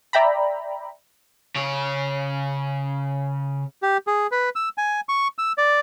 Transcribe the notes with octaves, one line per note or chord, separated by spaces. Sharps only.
D5 E5 G5 A#5 B5
C#3 C#5
G4
G#4
B4
E6
G#5
C#6
E6
D5